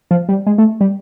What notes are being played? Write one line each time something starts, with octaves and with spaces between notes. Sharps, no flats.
F3
G3
G#3
A3
G3